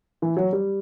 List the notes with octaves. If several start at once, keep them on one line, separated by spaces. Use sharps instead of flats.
E3
F#3
G3